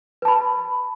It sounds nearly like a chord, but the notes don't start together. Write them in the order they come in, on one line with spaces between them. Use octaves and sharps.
B4 A5 B5